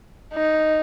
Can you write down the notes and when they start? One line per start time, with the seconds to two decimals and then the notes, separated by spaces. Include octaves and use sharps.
0.34 D#4